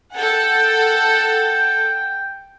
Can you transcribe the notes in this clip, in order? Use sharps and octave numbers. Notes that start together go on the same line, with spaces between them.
A4 F#5 G5